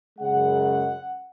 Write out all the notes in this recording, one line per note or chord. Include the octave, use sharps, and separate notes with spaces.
F#2 C#3 G#3 F#5